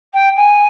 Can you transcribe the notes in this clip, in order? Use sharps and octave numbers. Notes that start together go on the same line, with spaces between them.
G5
G#5